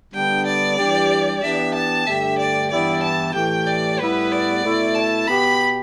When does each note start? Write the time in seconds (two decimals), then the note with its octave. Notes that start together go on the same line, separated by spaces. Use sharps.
0.14 D3 G3 B3 D4 G5
0.46 D5
0.78 E3 G3 D4 G4
1.42 E3 B3 D4 G4 E5
1.75 A5
2.07 G2 D3 A3 G4 E5
2.39 D5
2.71 G2 E3 B3 E4 G4 D5
3.03 A5
3.34 A2 E3 A3 G4 G5
3.67 D5
3.99 A2 G3 B3 E4 B4
4.32 D5
4.64 B2 A3 E4
4.95 A5
5.27 B2 B3 G4 B5